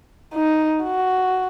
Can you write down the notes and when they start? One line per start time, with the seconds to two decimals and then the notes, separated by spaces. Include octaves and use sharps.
0.34 D#4
0.84 F#4